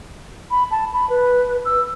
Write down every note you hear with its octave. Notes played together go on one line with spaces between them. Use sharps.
B5
A5
B5
B4
E6